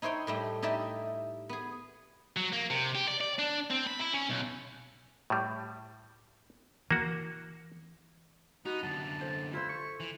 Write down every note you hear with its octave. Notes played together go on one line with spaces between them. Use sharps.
D#4 E4 C5 C#5 G5
A2 G3 A3
D#4 E4 G4 D5 E5
B3 G#4
F#3
A#3
C3
G4
D5
D5
D4
C4
B5
E4
C#4
B1
A2 G3
E3 A#3 F#4
B3 D#4 F#4
F#2 D3 F#5 A5
A4 C5
E4 F4 A4 C5
C#6
E3